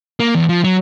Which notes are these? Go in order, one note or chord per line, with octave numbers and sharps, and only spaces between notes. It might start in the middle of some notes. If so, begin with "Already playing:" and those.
A#3
E2
F3
F#3